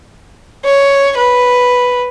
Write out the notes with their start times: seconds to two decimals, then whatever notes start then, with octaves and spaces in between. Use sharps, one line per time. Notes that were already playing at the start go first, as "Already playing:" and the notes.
0.65 C#5
1.17 B4